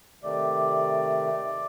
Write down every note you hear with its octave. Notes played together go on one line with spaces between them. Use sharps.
C3 D#3 A3 D5